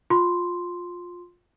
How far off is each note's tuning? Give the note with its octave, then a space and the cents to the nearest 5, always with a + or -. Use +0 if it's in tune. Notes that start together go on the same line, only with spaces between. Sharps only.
F4 +15 C6 -5